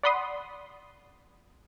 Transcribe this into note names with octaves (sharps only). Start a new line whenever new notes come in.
D5 F#5 B5 C6 D#6